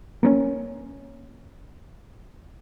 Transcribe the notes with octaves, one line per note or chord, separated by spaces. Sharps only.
A#3 B3 C#4